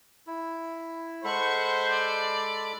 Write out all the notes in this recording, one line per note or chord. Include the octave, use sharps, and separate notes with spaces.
E4
G#3 A4 C5 F#5 B5 C#6
D5